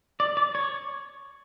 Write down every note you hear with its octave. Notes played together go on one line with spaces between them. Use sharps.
D5
D5
C#5